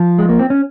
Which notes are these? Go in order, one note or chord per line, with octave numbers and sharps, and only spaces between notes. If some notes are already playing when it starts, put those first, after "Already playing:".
Already playing: F3 F4
G#3
A#3
C4
C#4